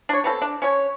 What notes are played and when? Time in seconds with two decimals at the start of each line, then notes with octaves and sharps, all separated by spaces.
0.09 D4 C#5
0.24 B3 C4 A4
0.42 D4
0.62 C#4 C#5